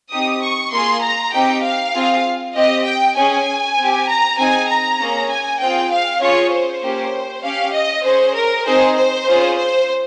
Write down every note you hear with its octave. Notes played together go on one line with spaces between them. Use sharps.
C4 D#4 G4 D#6
C#6
A#3 F4 G#4 C6
A#5
C4 D#4 G4 G5
F5
C4 F4 G#4
C4 G4 D#5
G5
C#4 G#4 G#5
C4
G4
A#5
C4 D#4 G#4 G#5
A#5
A#3 C#4 G#4
G#5
C4 F4 G#4 G5
F5
C#4 F4 G#4 C#5
C5
A#3 C#4 G4
C#4 G4 F5
D#5
C#4 G#4 C5
A#4
C4 D#4 G#4 C5
C5
C#4 F4 G#4
C5